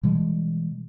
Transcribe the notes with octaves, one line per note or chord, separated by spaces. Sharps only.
B2 E3 G3 G#3